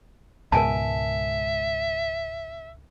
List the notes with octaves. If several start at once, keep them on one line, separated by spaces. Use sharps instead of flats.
C#2 G#2 B2 A#4 E5 G#5 A5